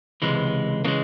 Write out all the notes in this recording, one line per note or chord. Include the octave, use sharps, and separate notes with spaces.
C#2 C3 E3 G#3
C#3 E3 G#3 A#3